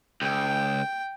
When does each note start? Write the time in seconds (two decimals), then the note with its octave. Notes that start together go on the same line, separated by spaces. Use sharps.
0.22 C#2 G5